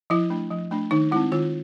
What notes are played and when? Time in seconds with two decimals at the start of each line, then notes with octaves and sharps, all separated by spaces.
0.10 F3 E4
0.30 A3 D4
0.51 F3
0.71 A3 D4
0.91 D#3 D#4
1.11 G#3 C4 E4
1.32 D#3 F4